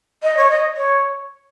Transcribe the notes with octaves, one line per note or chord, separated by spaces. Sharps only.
D#5
C#5
D#5
C#5